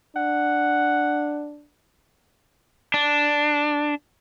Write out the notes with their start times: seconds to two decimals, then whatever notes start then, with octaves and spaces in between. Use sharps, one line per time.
0.16 D4 F#5
2.94 D4